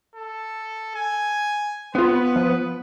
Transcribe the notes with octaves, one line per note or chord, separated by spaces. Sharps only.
A4
G#5
B3 C4 F4 B4
F3